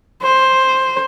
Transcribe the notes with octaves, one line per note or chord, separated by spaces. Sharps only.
C5